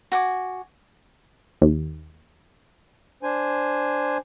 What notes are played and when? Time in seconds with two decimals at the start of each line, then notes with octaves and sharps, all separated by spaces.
0.12 F#4 F#5 G#5 D6
1.62 D#2
3.23 D4 C5 G#5